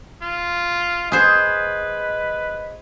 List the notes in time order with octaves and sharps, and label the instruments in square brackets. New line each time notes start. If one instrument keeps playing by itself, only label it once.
[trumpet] F4
[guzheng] G#4 C5 [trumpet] B4 [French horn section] D#5